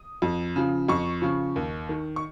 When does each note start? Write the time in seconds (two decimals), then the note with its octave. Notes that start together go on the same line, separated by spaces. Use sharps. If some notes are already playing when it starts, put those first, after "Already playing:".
Already playing: D#6
0.22 F2
0.56 C#3 F3
0.89 F2 C#6
1.22 C#3 F3
1.56 D#2
1.89 D#3
2.16 C#6